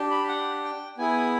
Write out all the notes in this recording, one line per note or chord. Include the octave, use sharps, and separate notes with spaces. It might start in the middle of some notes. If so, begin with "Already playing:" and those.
Already playing: D4 G4
B5
F#5
G5
B3 E4 G#4 G#5